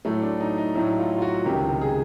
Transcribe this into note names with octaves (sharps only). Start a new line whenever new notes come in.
A2 F#3 A3
D4
D#4
D#4
A2 F#3 E4
F4
F4
F#4
C#2 C3 D#3 G4
G#4